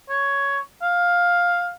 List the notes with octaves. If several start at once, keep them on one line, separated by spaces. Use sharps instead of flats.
C#5
F5